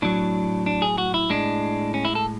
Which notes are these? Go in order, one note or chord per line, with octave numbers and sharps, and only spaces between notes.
A2 F#3 D4
D4
G#4
F#4
E4
A2 G#3 D4
C#4
E4
A4